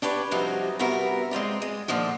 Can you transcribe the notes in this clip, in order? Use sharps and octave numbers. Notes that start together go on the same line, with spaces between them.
D4 G4 B4 C#5
G2 C3 F3 F#3 D#4
G2 C3 B3 F#4 A#4 E5
G#3 C4 F4 D5
G#3
A#2 D3 D#3 F3